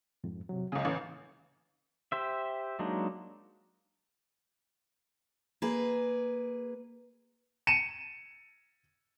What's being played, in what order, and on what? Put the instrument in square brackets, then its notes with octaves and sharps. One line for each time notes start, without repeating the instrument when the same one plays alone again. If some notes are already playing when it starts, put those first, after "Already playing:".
[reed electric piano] F2 G#2
C3 F#3
[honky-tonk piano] C#2 C#3 [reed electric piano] G#5
[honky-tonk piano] A1
[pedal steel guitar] G4 C5 E5
F#3 G#3 A#3 D4 D#4
[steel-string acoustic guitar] A#3 G#4 B4
[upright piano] C#7 D#7 E7